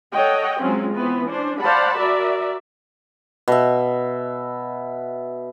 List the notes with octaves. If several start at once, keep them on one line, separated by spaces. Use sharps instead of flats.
A4 C#5 D#5 F#5 G5
F#3 G#3 C4 C#4 F4
E3 B3 C4 B4
C#4 D4 C5
C5 D5 F5 F#5 A5 B5
F#4 A#4 D5 E5
B2 E5